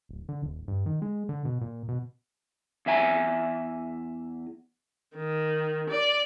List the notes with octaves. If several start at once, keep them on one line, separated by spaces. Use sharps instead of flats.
D1
D3
D#1
G2
D#3
G#3
D3
B2
A#2
B2
E2 E3 E5 G#5 A#5
D#3
D5